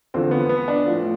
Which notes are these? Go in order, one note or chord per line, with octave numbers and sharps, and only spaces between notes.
E2 D3 F3 C4
B3
B3
D4
A2 F3